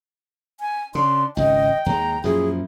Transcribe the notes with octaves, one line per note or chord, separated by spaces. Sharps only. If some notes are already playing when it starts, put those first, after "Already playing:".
G#5
C#3 D4 C6
G#1 C#2 D#5 G5
D#2 G#3 A#5
F#2 A#2 F3 E4 G#4